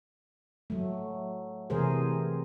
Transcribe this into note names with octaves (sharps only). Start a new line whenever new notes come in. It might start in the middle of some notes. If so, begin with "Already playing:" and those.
F#3 A3
C3 E3 A3 G#4 A#4 C5